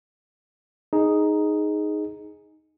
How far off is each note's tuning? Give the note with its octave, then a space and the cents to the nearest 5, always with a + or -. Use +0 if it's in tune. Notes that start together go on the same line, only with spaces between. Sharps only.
D#4 +0 G#4 +0